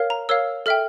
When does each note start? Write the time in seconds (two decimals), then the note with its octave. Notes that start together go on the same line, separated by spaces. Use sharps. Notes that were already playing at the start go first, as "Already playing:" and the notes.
Already playing: A#4 C#5 F5
0.10 A#5
0.29 A#4 C#5 F5 E6
0.66 A4 E5 G5 F6